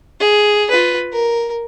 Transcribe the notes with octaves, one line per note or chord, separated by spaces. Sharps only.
G#4
F4 B4
A#4